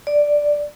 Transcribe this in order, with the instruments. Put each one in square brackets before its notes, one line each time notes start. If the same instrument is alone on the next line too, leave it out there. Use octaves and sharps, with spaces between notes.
[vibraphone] D5